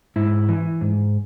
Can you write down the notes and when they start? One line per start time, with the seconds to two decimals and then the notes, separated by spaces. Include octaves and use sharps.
0.16 G#2 E4
0.49 E3
0.81 G#2